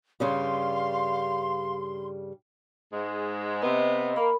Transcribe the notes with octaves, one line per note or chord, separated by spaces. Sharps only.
G2 C#3 G3 F5 C6
G#2 G#3
C3 B3 D#5
A#3 A#4 B5